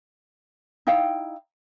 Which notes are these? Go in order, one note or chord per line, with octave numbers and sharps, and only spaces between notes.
D#4 E4 F5 G5